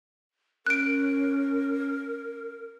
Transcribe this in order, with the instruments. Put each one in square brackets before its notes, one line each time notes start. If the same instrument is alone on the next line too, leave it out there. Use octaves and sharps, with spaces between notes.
[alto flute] C#4 [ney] A#4 [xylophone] F#6 D7